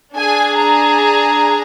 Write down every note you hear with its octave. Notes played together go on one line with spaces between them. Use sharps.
D4 G#4 G#5
A#5